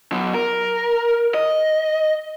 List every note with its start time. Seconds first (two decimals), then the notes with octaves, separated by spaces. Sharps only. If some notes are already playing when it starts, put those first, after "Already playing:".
0.12 F#3 B3
0.34 A#4
1.34 D#5